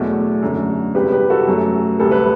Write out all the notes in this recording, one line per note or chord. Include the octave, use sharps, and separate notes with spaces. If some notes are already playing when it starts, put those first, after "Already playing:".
Already playing: E2 B2 F#3 A3 F#4 A4
F#2 D3 A3
E2 C3 G3 G4 B4
G4 B4
F#4 A4
F#2 F#3 A3
D2 C3 G3 A4
B4